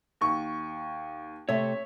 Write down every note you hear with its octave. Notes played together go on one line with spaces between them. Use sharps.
D#2 C#6
C3 A3 C#5 E5